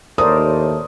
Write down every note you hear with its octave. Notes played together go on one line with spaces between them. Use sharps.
D#2 A2 A#4 C5 D5 D#6